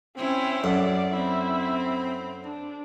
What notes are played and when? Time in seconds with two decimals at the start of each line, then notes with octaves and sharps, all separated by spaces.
0.17 C4 C#4 E4
0.64 F#2 A4 D5 F#5
1.14 C4 E4
2.44 D4